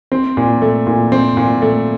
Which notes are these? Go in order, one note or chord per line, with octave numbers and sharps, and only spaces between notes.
C4
A#2
A3
A#2
C4
A#2
A3